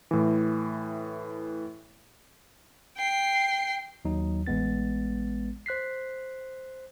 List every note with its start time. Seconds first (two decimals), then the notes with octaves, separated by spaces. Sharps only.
0.11 A2 E3
2.97 G5 C7
4.05 D#2 F#3 D#4
4.47 A1 G#3 B3 A6
5.66 C5 F#6 B6 C7